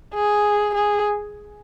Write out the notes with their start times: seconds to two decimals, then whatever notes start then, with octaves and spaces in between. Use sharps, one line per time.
0.14 G#4
0.74 G#4